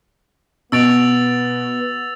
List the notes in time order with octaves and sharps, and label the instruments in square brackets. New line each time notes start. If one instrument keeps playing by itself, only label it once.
[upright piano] B2 D7 [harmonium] B3 [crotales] E6 A6 F7